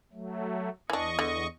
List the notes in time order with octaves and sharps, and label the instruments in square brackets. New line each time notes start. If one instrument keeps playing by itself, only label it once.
[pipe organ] F#3 A3
[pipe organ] E2 D#5 C#6 [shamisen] E3 D4
[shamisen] D3